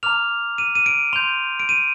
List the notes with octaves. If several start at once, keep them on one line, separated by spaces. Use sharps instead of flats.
A#5 D6 F6 F7
D#7
D#7
D7
C6 G6 F7
D7
D#7